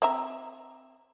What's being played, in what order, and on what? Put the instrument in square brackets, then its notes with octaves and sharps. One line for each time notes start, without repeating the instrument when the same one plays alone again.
[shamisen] C4 E5 A#5